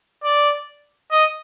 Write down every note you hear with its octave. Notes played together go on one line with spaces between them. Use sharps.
D5
D#5